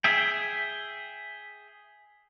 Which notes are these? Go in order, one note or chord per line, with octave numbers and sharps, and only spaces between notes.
G#4 E5 G5